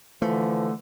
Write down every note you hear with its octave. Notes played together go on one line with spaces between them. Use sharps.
D3 E3 F3 A3